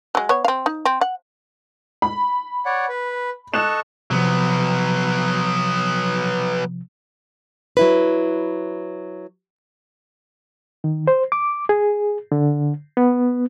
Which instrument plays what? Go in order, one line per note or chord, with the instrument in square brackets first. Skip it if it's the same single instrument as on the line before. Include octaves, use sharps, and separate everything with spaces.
[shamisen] F#3 G#3
B3 C#5
C4 F5
D#4
C4
F#5
[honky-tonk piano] B5
[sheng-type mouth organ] C#5 D5 F#5
B4
[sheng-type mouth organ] A4 D#5 C#6 [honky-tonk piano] F#6 E7
[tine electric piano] C3 F3 [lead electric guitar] F#3 B3
[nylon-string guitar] F#3 E4 B4
[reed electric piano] D#3
C5
D6
G#4
D3
B3